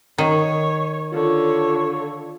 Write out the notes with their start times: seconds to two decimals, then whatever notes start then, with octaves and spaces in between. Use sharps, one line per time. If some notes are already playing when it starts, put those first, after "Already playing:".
0.18 D#3 C#5
1.13 D3 F4 C#5